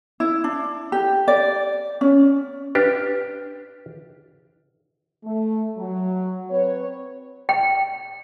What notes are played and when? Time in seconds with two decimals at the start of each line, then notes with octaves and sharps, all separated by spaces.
0.20 E4
0.44 D4
0.92 G4
1.28 D5
2.01 C#4
2.75 D4 G4 B4
5.24 A3
5.77 F#3
6.50 C4 B4 C#5
7.49 G5